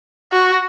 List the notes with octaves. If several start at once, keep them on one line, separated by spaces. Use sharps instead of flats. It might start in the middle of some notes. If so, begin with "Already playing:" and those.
F#4